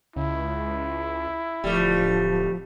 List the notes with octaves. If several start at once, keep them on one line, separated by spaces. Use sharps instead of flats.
C#2 E4
D1 F3 G3 A3